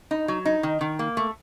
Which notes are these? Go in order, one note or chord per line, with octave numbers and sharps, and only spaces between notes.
D#4
F#3
D#4
D#3
D#3
A#3
A3